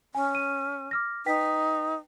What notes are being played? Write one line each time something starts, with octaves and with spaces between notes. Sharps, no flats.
C#4 G#5
D#7
D6 F6 A#6
D#4 B4 G5 B6